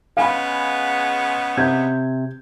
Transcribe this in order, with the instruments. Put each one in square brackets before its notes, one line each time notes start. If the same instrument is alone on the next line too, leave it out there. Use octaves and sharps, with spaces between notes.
[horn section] C#3 G#3 B3 [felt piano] F5 G#5 B5
[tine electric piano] C3 [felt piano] G6 G#6